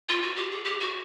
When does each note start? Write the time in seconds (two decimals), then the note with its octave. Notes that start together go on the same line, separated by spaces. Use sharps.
0.09 F4
0.22 F#4
0.36 G4
0.51 G#4
0.65 G4
0.80 F#4